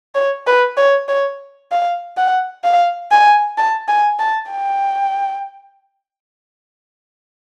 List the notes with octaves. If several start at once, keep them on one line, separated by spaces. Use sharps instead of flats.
C#5
B4
C#5
C#5
F5
F#5
F5
G#5
A5
G#5
A5
G5